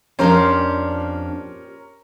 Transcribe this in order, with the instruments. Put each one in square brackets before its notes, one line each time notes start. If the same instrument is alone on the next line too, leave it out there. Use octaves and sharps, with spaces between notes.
[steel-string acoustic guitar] F2 D4 [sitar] A#2 G4 C5 [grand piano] C#4 A#4